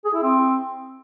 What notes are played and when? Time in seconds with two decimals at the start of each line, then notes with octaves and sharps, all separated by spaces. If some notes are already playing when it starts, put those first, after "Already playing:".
0.05 G#4
0.14 E4
0.23 C4